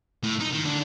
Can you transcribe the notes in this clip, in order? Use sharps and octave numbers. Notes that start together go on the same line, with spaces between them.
A2
D#4
D#3
D3